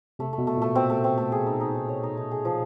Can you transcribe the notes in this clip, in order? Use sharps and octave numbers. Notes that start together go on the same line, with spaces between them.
C3 A3
A3
B2
A3
A#2
A3
B2 C4
A3
C4
A3
G#4
D#4
D#4
D#4
C#5
D#4
D#4
G#4
F3